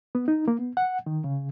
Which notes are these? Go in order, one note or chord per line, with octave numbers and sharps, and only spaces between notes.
B3
D#4
A#3
B3
F#5
D#3
C#3